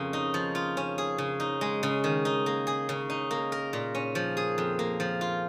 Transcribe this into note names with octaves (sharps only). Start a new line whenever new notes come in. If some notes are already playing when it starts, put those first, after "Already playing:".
Already playing: F2 C#3 A#3
D#4
F3
F4
C#4
G#4
C#3
D#4
G#3
C#3
D#3
D#4
A#3
G#4
C#3
D#4
A#3
A#4
A#2
C#4
F3
G#4
F2
A#3
F3
F4